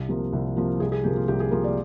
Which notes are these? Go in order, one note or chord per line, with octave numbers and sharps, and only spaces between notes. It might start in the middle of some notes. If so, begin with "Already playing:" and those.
Already playing: C2
C3 F3 A#3
C2
C3 F3 A#3
C2 G#4
G#4
C3 F3 A#3 G4
F4
C2 G4
G#4
C3 F3 A#3 A#4
D5